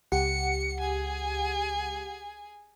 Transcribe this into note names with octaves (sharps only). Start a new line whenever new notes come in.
C#2 G4 F#5 C#7
G#4 G#5